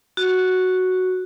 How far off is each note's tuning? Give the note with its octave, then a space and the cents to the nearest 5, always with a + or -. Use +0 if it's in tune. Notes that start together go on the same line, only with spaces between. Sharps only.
F#4 +0